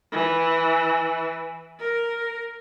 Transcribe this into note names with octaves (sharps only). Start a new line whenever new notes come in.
E3
A#4